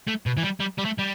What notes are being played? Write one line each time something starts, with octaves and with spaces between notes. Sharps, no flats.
A3
B2
E3
G3
G3
G3
A3
G3